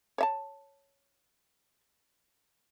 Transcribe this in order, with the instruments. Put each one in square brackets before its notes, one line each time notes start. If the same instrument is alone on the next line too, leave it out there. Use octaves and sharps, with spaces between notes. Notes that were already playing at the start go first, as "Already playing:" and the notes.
[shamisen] C#5 E5 A5